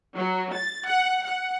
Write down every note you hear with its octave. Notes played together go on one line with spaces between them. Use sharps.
F#3
A6
F#5
F#5